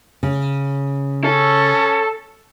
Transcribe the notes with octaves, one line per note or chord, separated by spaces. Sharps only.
C#3
C#4 A4